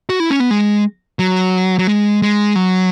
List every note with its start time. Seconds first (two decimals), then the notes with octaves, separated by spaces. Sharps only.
0.10 F#4
0.20 E4
0.30 C#4
0.40 B3
0.51 G#3
1.19 F#3
1.79 F#3
1.87 G#3
2.22 G#3
2.56 F#3